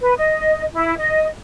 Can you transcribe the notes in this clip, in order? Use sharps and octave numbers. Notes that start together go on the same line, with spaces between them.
B4
D#5
E4
D#5